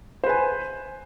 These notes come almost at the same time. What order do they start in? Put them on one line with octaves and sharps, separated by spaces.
C5 B4 G#5